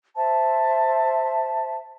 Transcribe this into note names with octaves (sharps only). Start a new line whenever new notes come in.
C5 E5 A5